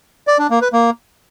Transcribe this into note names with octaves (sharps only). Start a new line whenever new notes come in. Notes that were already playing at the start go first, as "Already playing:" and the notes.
D5
D4
A#3
B4
A#3